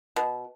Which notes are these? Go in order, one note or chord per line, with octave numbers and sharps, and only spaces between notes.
B2